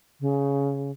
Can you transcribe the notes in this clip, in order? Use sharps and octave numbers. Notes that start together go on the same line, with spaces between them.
C#3